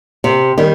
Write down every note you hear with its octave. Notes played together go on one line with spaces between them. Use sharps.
C3
D#3 G3